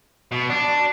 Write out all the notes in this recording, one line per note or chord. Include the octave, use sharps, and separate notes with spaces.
B2
D4